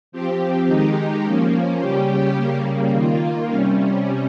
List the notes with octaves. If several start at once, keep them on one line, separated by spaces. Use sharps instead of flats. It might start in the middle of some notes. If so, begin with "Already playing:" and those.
F3 C4 G4
D#3 G#3 D#4 G4
F3 A#3 C#4
C#3 G3 C#4 G4
C#3 G3 A#3
D#3 A#3 F4
C3 G3 C#4